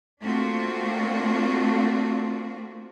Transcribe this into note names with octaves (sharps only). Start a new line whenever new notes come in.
A3 A#3 C4 D4 F4 F#4